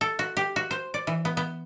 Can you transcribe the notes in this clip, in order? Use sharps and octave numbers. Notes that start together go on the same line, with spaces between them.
A4
F#4
G4
F#4
C5
D5
E3
B3
B3